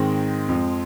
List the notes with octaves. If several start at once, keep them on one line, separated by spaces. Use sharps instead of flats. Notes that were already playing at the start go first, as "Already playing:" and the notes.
Already playing: G#2 D#3 G#3 C4
F2 F3